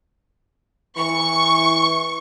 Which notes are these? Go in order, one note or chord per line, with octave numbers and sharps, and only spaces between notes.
E3 C#6